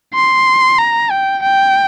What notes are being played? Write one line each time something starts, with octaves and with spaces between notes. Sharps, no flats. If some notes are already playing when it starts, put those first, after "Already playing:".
C6
A#5
G5
G5